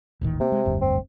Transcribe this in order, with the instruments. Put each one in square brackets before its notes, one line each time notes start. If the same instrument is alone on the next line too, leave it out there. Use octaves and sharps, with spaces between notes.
[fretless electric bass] D#1 A1 D#3
[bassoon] C3 [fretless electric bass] A#3
[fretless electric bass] G#3
F1 D2 G2
[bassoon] C4